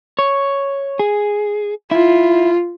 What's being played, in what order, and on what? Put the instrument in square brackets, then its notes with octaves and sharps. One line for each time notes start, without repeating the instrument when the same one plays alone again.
[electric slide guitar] C#5
G#4
[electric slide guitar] E4 [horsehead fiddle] F4